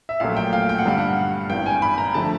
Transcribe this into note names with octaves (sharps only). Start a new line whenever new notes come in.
E5
A#1 A#2 F#3 A3 F5
G5
F5
G5
F#5
G2 D3 G3 F5
F#5
G#1 G2 E3 G5
G#5
B5
A#5
D3 F3 A3 A5